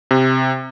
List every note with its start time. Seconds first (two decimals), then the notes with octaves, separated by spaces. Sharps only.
0.11 C3